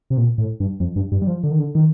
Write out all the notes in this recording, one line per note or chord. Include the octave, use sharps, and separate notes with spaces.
C3
A#2
A2
G2
F2
G2
G2
G3
F3
D3
D#3
D3
D#3